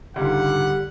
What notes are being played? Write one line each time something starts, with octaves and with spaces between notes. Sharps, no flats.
C#2 G#2 D3 G3 F#5